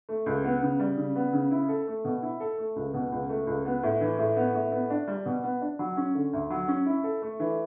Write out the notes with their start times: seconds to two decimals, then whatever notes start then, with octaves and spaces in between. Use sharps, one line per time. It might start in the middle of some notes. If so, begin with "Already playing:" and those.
0.09 A3
0.26 C#2
0.44 B3
0.62 C#3
0.79 G3
0.97 C#3
1.16 B3
1.33 C#3
1.51 E4
1.69 A4
1.87 A3
2.05 B2
2.22 E4
2.40 A4
2.58 A3
2.76 C#2
2.94 B2
3.12 C#2
3.29 A3
3.47 C#2
3.65 B3
3.83 A2
4.01 E3
4.19 A2
4.36 B3
4.54 A2
4.72 B3
4.90 D4
5.08 G3
5.26 B2
5.44 B3
5.61 D4
5.79 F#3
5.97 C#4
6.15 D3
6.33 D2
6.50 F#3
6.68 C#4
6.86 E4
7.04 A4
7.22 A3
7.40 E3